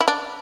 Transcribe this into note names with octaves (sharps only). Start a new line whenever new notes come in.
E4
D4